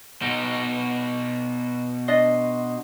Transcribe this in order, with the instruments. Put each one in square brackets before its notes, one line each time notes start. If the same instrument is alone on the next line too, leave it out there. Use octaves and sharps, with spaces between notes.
[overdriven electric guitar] B2 D#4
[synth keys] D4 D#5 C6